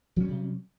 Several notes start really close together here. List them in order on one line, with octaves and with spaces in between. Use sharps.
F#3 C#4 G3 C3